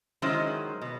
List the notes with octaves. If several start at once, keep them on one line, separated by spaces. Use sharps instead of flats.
D#3 F#3 G#3 C#4 E4 C5
B2